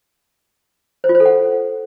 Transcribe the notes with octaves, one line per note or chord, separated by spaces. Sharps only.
C5
F4
C5
A4
F#5